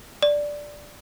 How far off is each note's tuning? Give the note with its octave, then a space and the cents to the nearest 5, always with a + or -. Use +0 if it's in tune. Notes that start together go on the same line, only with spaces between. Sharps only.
D5 +0